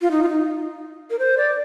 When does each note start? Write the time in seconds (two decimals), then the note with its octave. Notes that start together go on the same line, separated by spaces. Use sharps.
0.02 F4
0.11 D#4
0.23 F4
0.29 D#4
1.10 A#4
1.19 C5
1.37 D5